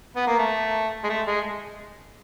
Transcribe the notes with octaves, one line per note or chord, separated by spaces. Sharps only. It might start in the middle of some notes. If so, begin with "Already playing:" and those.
B3
A#3
A3
G#3
A3
G#3